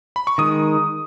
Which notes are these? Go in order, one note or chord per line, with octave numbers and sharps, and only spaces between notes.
B5
C#6
D#3 G#3 D#6